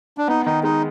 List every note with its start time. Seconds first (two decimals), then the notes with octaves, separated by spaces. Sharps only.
0.18 D4
0.28 B3 D#4
0.46 D#3 D#4
0.63 G#3 D#4